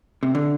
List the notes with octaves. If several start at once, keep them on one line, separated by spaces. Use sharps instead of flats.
C3
D3